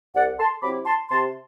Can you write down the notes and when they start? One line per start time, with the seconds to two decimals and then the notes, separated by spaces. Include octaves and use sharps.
0.15 C2 D5 F#5
0.39 A5 C6
0.62 C3 F#3 C4 E4 B5 D6
0.85 A5 C6
1.10 C3 A5 C6